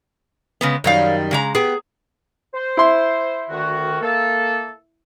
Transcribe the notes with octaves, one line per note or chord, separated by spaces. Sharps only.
C#3 G#3 B3
F#2 D#3 G3 C#5 F5
C#3 G#3 A#5
B3 G4 G#4
C5
E4 C6
D2 D#3 F#4
A#3 A4